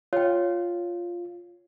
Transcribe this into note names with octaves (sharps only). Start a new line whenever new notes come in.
F4 C#5 G5